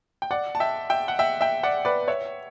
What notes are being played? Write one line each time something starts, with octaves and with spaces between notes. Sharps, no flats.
G5
D5 F#5
A5
E5 G5
E5 G5
F#5
E5 G5
E5 G5
D5 F#5
B4 D5
C#5 E5